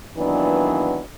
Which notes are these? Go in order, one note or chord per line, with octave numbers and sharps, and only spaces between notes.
A#2 D#3 E3 F#3 B3 D4